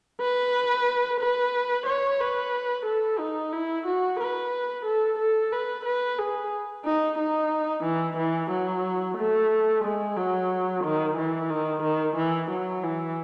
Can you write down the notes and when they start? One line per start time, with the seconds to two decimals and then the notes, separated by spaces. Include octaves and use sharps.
0.21 B4
1.21 B4
1.87 C#5
2.20 B4
2.86 A4
3.19 D#4
3.52 E4
3.86 F#4
4.20 B4
4.85 A4
5.19 A4
5.52 B4
5.85 B4
6.19 G#4
6.85 D#4
7.18 D#4
7.84 E3
8.17 E3
8.51 F#3
9.18 A3
9.84 G#3
10.17 F#3
10.84 D#3
11.18 E3
11.50 D#3
11.83 D#3
12.17 E3
12.51 F#3
12.83 E3